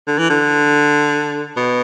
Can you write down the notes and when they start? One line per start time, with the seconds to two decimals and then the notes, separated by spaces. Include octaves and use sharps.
0.07 D3
0.18 E3
0.30 D3
1.56 B2